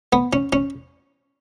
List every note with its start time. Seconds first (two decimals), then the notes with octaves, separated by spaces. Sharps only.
0.13 B3
0.33 C#4
0.53 C#4